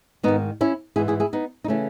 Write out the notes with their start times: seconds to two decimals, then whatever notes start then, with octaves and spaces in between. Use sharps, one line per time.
0.23 G#2 D#3 B3 D#4
0.61 C#4 E4
0.96 G#2 E3 E4 G#4
1.08 E4 G#4
1.20 E4 G#4
1.33 B3 D#4
1.64 D#4
1.68 C#3 E3 A3 C#4